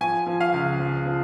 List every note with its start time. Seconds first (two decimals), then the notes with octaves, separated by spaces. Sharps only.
0.01 F3 G#5
0.27 F3
0.41 F5
0.54 C#2
0.80 F3
1.06 F3